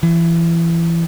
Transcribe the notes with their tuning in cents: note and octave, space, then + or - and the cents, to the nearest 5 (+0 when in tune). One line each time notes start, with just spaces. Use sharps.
E3 +25